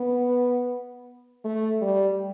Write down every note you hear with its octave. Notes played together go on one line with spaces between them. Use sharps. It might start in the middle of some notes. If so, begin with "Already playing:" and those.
Already playing: B3
A3
G3